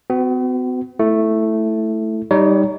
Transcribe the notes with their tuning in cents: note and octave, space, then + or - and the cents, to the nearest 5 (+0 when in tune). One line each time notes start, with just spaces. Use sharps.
B3 +45 F#4 +0
A3 +0 E4 +0
G3 +0 D#4 +0 C#5 +30